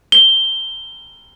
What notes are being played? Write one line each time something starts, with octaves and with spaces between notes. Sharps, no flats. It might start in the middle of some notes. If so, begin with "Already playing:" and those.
G7